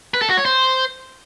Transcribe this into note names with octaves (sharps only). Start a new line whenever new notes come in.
B4
A4
F#4
C#5
C5